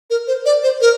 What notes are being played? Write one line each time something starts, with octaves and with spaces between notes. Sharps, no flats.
A#4
C5
D5
C5
A#4